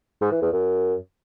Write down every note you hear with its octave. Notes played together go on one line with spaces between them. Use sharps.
G#2
E3
E2
F#2